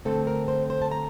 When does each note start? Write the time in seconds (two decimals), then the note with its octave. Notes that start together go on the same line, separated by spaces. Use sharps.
0.05 D3 A3 C4 A4
0.27 A#4
0.48 C5
0.70 C5
0.82 A5
0.92 A#5